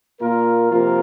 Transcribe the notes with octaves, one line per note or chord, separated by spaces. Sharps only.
A#2 A#3 F4 A#4
C3 F3 A#3 F4 A#4